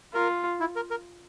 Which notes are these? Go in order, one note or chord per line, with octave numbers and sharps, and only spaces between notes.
F4 A#4
E4
A#4
A#4